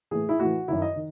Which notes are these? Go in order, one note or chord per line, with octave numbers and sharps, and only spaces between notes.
A2 E3 G#4
E4
A2 E3 F#4
F#2 D#3 E4
D#5
D#3